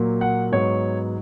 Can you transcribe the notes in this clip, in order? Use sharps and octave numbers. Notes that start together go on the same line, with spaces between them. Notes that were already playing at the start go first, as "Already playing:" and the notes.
Already playing: A#2 F#3 A#3
F#5
G#2 F#3 B3 C#5